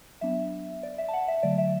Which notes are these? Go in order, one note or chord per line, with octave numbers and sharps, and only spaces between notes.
F#3 B3 D4 E5
D5
E5
A5
F#5
E5
D3 F#3 A3 D5
E5